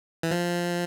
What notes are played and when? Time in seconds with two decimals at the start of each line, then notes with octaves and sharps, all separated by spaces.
0.23 E3
0.31 F3